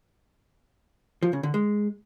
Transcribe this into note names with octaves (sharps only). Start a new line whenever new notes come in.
F3
C#3
D3
G#3